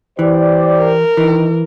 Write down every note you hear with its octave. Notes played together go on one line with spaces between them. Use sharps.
E3 G4 C5 D5
A#4
D#3 E3